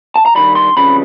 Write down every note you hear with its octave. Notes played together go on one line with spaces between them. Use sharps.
A5
A#5
G2 D#3 G3 B5
C6
F2 C#3 E3 G3 B5